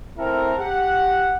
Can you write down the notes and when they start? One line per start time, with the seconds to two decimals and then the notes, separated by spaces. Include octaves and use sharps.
0.18 A3 C4 E4 A4 A#4
0.59 G4 F#5